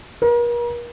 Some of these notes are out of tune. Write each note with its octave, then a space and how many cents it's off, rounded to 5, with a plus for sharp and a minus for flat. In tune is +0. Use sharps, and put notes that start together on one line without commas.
A#4 +40